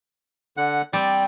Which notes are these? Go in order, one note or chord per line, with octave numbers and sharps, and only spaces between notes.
D3 F#5
G3 C4 D5